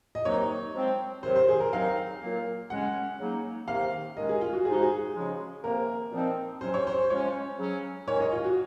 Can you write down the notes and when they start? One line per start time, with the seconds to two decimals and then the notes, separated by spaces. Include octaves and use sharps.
0.15 D#5
0.25 C3 D#3 F#3 A#3 D#4 C#5
0.74 F3 G#3 C4
1.23 C3 D#3 F#3 C5
1.36 C5
1.48 G#4
1.60 A#4
1.72 D#3 F#3 C4 D#4 F5
2.21 A#2 F#3 A#3
2.70 C#3 G#3 C#4 F#5
3.19 C#3 F#3 A#3 D#4
3.68 C3 D#3 A#3 D#4 F5
4.17 D#3 G#3 C#4 D#5
4.29 G#4
4.41 F4
4.53 F#4
4.65 F3 G#3 D#4 G#4
4.74 F#4
4.82 G#4
5.15 C#3 F3 G#3
5.63 C3 D#3 A#3 A#4
6.12 A#2 F3 C4 D#4
6.61 C3 F#3 C#4 C5
6.74 C#5
6.87 C5
7.10 F3 G#3 C#4 C#5
7.59 C#3 F#3 C#4
8.07 D#3 G#3 C#4 C#5
8.20 D#5
8.32 F4
8.44 F#4